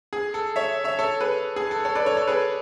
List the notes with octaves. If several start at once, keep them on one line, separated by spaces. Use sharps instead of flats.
G#4
A4
C#5 E5
C#5 E5
A4 C#5
G#4 B4
G#4
A4
A4 C#5
B4 D5
A4 C#5
A4 C#5
G#4 B4